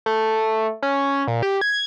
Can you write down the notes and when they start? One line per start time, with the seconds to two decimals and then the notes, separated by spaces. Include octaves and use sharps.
0.06 A3
0.83 C#4
1.28 A#2
1.43 G4
1.61 G#6